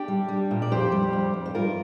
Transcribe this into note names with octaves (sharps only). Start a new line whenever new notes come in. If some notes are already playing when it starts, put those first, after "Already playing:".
Already playing: D4 G4
G3
G3
A#2
D5
F2 G4 C5
G3
F2
F2
C5
G2 F4 A#4